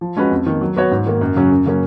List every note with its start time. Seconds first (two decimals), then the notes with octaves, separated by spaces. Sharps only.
0.01 F3
0.17 G#3 C#4 F#4 B4
0.31 F2
0.46 D#3 A#3
0.61 F#3
0.76 B3 F#4 C#5
0.91 G#2
1.06 D#3 A#3
1.21 F#2
1.36 C#3 F#3 C#4
1.51 F#2
1.66 C#3 F#3 A#3 C#4